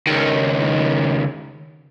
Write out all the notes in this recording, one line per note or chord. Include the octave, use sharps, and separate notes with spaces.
C#2 D#3